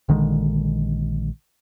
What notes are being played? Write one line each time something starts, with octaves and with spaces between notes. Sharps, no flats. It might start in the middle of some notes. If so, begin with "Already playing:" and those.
A#1 D3 D#3 G#3